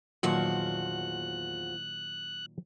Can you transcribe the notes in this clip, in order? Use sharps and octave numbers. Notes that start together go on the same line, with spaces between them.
E2 A#2 D#3 F3 F#3 F#4 F#6